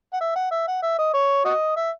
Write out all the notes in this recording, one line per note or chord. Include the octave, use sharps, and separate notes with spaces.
F#5
E5
F#5
E5
F#5
E5
D#5
C#5
F#4 D#5
E5